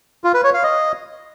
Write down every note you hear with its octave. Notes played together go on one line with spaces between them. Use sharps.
F4
B4
C#5
F5
D#5